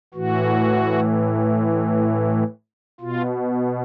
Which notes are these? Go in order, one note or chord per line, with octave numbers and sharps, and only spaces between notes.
A2 E3 F#4
B2 F4